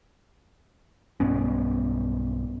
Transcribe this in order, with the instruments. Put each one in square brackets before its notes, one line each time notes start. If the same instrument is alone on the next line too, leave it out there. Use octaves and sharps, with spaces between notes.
[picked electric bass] B1 G2 B3 C#4